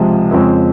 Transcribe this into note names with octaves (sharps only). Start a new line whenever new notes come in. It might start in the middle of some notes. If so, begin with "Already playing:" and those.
Already playing: C#2 C3 F3 G#3
F2 C#3 F3 G#3 C4